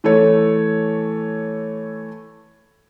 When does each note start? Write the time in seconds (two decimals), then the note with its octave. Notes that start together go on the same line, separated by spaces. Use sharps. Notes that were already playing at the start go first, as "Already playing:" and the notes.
0.04 E3 A3 A4 C#5